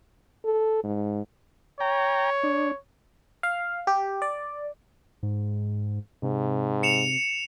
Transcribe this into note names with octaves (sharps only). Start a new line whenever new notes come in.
A4
G#2
C#5 G5 A#5
D4
F5
G4
D5
G#2
G#2 C3
C#7 E7 F7